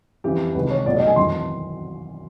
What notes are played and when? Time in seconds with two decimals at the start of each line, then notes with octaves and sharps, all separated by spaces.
0.24 F2 C#3 E3 G4
0.55 C#2 C3 D#3 G#3 B4
0.70 C#5
0.86 B1 B2 F#3 A3 D5
0.97 D#5
1.07 G#5
1.16 G#1 F#2 C#3 E3 C6